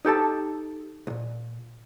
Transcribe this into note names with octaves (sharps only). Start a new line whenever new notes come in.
D#4 G4 A4 A5
B1 A#2